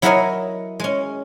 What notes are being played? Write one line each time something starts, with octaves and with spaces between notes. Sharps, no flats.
F#3 E4 F#4 A#4 C#5 D#5
G#3 C#4